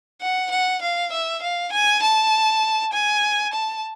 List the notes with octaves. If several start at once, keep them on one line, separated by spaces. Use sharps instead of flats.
F#5
F#5
F5
E5
F5
G#5
A5
G#5
A5